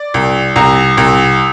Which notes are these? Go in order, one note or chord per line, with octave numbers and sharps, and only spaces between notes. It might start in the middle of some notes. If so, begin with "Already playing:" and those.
Already playing: D5
C2
C2 A#5
C2